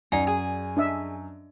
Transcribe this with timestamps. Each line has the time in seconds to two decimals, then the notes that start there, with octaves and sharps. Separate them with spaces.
0.12 F#2 D#4 D5 F#5 G#5
0.27 G#4
0.77 D4 D#5 E5